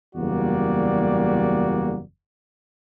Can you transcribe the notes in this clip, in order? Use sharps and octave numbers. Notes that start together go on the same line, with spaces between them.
F#1 E2 G3 A#3 F#4 D5